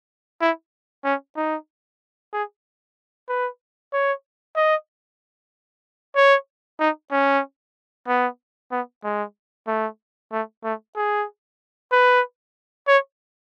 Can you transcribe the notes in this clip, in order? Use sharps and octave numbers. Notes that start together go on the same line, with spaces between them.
E4
C#4
D#4
G#4
B4
C#5
D#5
C#5
D#4
C#4
B3
B3
G#3
A3
A3
A3
G#4
B4
C#5